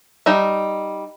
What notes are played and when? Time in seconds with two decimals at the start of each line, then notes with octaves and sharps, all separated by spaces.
0.26 G3 D#4 E5